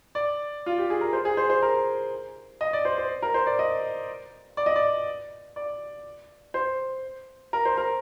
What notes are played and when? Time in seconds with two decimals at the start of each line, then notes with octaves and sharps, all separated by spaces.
0.15 D5
0.66 F4
0.78 G4
0.90 G#4
1.01 A#4
1.13 C5
1.25 G#4
1.37 C5
1.50 C5
1.62 A#4
2.61 D#5
2.73 D5
2.85 C5
2.98 C5
3.22 A#4
3.34 C5
3.46 D5
3.59 D#5
4.57 D5
4.66 D#5
4.76 D5
5.56 D5
6.54 C5
7.53 A#4
7.65 C5
7.77 A#4